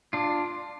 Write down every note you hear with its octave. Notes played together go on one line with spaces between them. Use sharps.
D4 F4